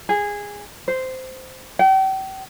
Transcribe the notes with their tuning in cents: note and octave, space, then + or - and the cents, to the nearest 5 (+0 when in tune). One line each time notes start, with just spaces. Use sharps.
G#4 -15
C5 -10
G5 -40